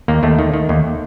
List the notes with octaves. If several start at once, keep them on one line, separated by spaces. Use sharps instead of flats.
D#2 A#3
D#2 A3
D#3
D#3
D#2